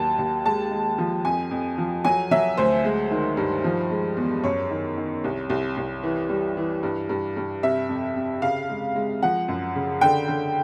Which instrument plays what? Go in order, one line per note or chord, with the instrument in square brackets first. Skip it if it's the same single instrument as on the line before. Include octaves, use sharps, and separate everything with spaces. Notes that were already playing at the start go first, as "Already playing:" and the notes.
Already playing: [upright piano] D#2 F#3 A5
D#2
G#3 A5
G#3
F3
F2 G#5
F2
F3
F#3 G#5
F#3 E5
D2 C5
G#3
D#3
G2
F3
G#3
E2
F#2 C#5
D#3
D#3
C2
C2
C2
E3
G3
E3
G2
G2
G2
C3 E5
F2
C3
C#3 F5
G#3
G#3
F3 F#5
F#2
C#3
D3 G5
D3